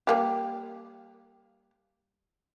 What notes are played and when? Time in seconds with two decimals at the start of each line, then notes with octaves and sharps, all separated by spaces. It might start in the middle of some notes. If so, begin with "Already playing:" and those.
0.07 G3 A#3 G4